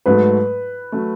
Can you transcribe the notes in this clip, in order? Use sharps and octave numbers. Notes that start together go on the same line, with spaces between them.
G#2 F#3 A3 B4
F#3 A3